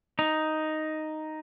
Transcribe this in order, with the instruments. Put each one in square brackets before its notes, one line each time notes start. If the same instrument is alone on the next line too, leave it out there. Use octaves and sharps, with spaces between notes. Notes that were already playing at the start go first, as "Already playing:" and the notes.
[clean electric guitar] D#4